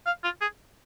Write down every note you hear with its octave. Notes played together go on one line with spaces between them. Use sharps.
F5
F4
G#4